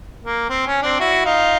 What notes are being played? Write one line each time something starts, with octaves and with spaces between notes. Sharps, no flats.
A#3
C4
C#4
C4 D4
E4 F#4
D#4 F4